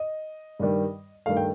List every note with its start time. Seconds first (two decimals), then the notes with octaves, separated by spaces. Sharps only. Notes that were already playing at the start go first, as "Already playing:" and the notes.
Already playing: D#5
0.59 G2 D#3 G3
1.26 G2 D#3 A3 F5
1.37 G5